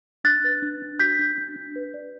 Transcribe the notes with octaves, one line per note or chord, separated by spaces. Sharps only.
D4 F#6 A6
B4
D4
D4
F#4 G6 B6
D4
D4
D4
B4
D5